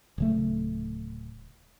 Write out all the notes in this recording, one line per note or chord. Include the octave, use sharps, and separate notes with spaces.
D1 C#3 A3